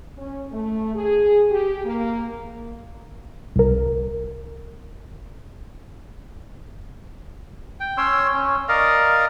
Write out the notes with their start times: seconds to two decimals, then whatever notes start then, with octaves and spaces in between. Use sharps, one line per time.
0.17 C#4
0.52 A3
0.94 G#4
1.51 G4
1.85 A#3
3.56 C2 A#4
7.80 G5
7.98 C#4 C#5 C6 E6
8.34 C#4
8.69 A#4 D5 D#5 F5